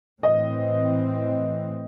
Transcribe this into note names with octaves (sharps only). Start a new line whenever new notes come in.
A2 E3 C4 D#5